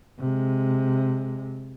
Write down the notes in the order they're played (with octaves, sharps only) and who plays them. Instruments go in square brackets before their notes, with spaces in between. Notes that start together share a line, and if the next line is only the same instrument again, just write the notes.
[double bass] C3 G#3